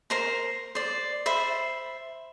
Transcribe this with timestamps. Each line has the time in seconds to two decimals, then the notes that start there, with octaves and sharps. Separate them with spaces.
0.10 A#4 C5 A#5
0.75 C5 D5
1.26 C5 E5 B5